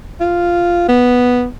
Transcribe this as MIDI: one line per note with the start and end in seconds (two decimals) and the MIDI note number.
0.20 0.85 65
0.88 1.46 59